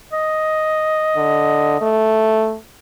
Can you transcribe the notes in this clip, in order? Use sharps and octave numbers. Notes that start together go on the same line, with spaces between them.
D#5
D3
A3